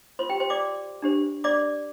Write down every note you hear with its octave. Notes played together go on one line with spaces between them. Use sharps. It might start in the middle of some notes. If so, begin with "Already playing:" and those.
F4 A#4 C5 C6
G4 G5
C5 C6
D5 D6
D4 G4 C5
D5 D6